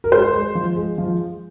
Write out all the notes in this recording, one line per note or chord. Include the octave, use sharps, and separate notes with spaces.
A#4
G#3 C5
G#3
F3
G#3
F3